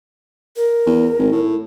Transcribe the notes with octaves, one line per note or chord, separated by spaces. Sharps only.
A#4
E2
G#1
A2